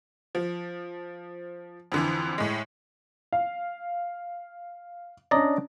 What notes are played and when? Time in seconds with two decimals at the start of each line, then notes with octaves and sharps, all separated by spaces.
0.35 F3
1.92 F2 D3 E3
2.38 A2 G#3
3.33 F5
5.31 C#4 D4 D5 D#5 A#5